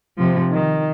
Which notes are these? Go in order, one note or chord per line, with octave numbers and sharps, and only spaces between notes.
C3 F3
D#3